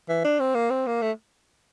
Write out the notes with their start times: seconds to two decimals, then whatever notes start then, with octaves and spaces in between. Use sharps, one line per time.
0.09 E3
0.25 D4
0.40 C4
0.55 A#3
0.70 C4
0.87 A#3
1.02 A3